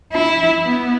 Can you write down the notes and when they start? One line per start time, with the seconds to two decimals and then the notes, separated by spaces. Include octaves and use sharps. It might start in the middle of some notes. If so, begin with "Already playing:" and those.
0.13 E4
0.66 B3